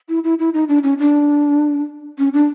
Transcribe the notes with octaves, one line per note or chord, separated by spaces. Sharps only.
E4
E4
E4
D#4
D4
C#4
D4
C#4
D4